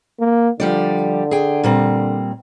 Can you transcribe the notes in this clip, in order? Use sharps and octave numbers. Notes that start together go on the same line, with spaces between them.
A#3
D3 F3 G3 D5
G#4 G5
A#2 G3 C4